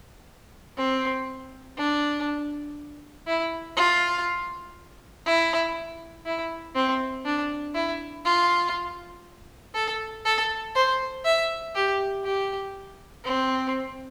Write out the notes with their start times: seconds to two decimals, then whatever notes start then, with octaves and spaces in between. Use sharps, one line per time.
0.77 C4
1.78 D4
3.27 E4
3.76 F4
5.26 E4
6.26 E4
6.76 C4
7.25 D4
7.75 E4
8.25 F4
9.75 A4
10.25 A4
10.75 C5
11.25 E5
11.75 G4
12.25 G4
13.24 C4